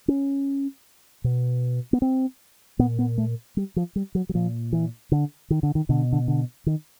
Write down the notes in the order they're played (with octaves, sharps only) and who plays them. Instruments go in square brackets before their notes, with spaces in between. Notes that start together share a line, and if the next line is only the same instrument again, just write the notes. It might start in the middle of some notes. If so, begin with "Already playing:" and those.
[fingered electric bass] C#4
B2
B3
C4
A#2 B3
B3
A3
G3
F3
G3
F#3
F#3
A#2 F3
E3
D3
D#3
D3
D#3
B2 D3
D3
D3
D#3